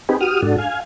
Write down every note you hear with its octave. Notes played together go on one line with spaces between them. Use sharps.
C4 D#4 G4 G#4 B4
F#4 G4 D#6 F6
G#2 D4 F#4 A4
F5 G#5